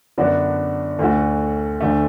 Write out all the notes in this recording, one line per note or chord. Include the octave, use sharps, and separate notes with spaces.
F#2 D3 B3 D4 F#4
D2 D3 A3 F#4
D2 D3 A3